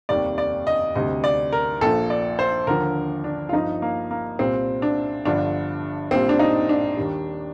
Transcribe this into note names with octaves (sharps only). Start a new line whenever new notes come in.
F1 D#2 D#3 G3 D5
D5
D#5
D2 C3 G3 D#5
D5
A#4
A#1 A#2 F3 A4
D5
C5
D#2 D3 F3 A#4
D4
F4
G1 G2 F3 D#4
A#3
A#3
C2 A#2 G3 C4
D4
G1 G2 D3 F3 D4
A#1 A#2 G3 C4
D4
D#4
D4
D#2 D#3 G3